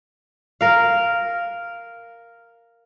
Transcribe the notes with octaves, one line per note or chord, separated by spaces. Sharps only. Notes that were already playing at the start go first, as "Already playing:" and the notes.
A#4 F5